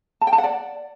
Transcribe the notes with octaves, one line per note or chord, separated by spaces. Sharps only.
A5
G5
A5
F#5
D5